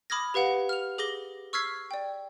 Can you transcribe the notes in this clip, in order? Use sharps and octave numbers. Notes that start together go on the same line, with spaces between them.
B5 D6 D#6 F6 G#6 A#6
G4 B4 F5 F#5
F6 F7
G#4 D6 A#6 G7
C#6 E6 F6 G#6 B6 C7
D5 G5